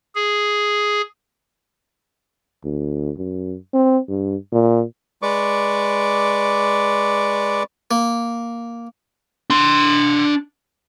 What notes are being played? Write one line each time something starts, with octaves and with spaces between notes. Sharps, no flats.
G#4
D2
F#2
C4
G2
A#2
G#3 B4 D5 C#6 D6
A#3
D4 C6